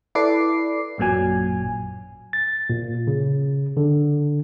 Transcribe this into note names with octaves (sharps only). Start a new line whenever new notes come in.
E4 A4 B4 D5 D6 C7
A1 F#2 A#2 F#3 G#5
A6
A#2
C#3
D3